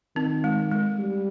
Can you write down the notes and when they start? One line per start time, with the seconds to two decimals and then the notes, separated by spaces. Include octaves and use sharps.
0.16 D#3 C4
0.44 G#3
0.71 G#3
0.99 G3